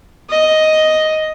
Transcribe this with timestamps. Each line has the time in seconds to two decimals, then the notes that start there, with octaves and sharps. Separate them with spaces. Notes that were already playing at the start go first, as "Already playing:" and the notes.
0.30 D#5